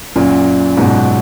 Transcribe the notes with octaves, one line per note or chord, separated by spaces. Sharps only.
F#2 A#2
G#2 B2